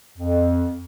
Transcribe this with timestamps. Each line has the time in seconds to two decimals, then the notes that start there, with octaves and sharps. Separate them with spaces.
0.18 F2